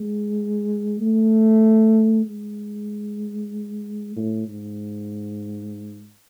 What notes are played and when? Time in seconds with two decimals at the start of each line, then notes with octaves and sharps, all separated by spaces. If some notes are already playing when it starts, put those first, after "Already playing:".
Already playing: G#3
1.00 A3
2.26 G#3
4.16 A2
4.48 G#2